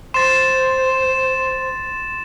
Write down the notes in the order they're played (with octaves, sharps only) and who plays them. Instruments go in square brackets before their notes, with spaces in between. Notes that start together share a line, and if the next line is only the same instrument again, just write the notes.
[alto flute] C5 [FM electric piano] C6 [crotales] A6 E7